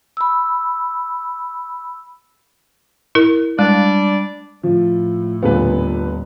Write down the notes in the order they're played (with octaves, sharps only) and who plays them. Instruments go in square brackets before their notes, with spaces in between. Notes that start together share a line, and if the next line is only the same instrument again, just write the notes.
[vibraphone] B5 E6
[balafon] E4 A#4
[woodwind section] G3 D4 D5 [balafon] G#3
[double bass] A2 [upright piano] F3
[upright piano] D#1 B3 [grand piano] A#2 D3 B4